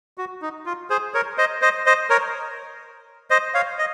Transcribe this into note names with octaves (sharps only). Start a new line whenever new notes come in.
F#4
D#4
F4
G#4 C5
A#4 C#5
C5 D#5
C5 D#5
C5 D#5
A#4 C#5
C5 D#5
C#5 F5
D#5